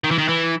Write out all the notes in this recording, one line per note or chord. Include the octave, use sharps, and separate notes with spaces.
D#3
E3
D#3
E3